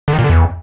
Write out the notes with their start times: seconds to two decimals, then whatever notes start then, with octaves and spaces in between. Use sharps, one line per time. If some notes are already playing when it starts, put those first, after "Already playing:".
0.08 D3
0.13 D#3
0.19 A#2
0.24 D3
0.30 E2